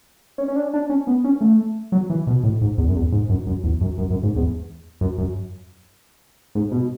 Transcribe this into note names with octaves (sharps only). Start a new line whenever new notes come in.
C#4
C#4
D4
D4
C#4
B3
C#4
A3
F#3
E3
B2
A2
G#2
E2
F#2
E2
G#2
F#2
F#2
E2
F#2
F#2
F#2
G#2
E2
F#2
F#2
G#2
B2